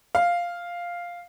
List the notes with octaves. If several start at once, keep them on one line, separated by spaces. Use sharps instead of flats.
F5